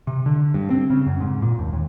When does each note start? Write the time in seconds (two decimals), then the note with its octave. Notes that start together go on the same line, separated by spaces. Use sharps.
0.07 C3
0.26 D3
0.54 G2
0.70 C4
0.90 C#3
1.07 F#2
1.20 G#2
1.42 A#2
1.59 D#2
1.73 D#2